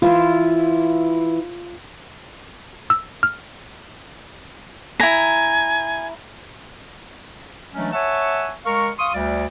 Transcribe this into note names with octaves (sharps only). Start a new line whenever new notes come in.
E3 E4 F4
E6
F6
E4 G#5 A#5
E3 F#3 G#3 A3 C#4 D4
C#5 E5 F#5 G#5 A5 C#6
G#3 A#4 F5 C#6
F5 C6 C#6 D#6
D2 G3 D5